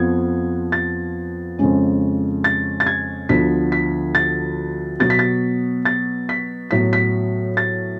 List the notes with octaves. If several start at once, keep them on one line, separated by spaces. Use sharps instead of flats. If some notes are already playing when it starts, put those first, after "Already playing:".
Already playing: F2 F3 B3 G#6
A6
F2 C#3 G#3 C#4
A6
A6
G#6
D2 D3 F3 B3 B6
B6
A6
B2 F#3 B3 A6
B6
A6
A6
B6
A2 F#3 B3 B6
B6
A6